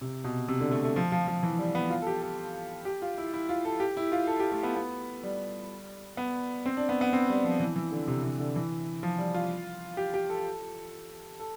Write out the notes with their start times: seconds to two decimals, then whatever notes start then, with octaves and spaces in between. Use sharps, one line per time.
0.01 C3
0.24 B2
0.48 C3
0.60 D3
0.71 A3
0.84 A3
0.96 F3
1.12 F3
1.28 F3
1.43 E3
1.59 G3
1.75 B3
1.90 F4
2.02 A4
2.07 G4
2.22 A4
2.85 G4
3.02 F4
3.18 E4
3.34 E4
3.49 F4
3.65 A4
3.80 G4
3.97 E4
4.12 F4
4.27 A4
4.40 G4
4.52 A3
4.63 B3
4.76 B3
5.23 G3
6.17 B3
6.66 C4
6.77 D4
6.89 B3
7.01 B3
7.13 C4
7.29 G3
7.44 F3
7.60 E3
7.76 E3
7.92 D3
8.08 C3
8.24 C3
8.39 D3
8.56 E3
9.03 F3
9.18 G3
9.34 F4
9.97 G4
10.14 G4
10.30 A4
11.40 A4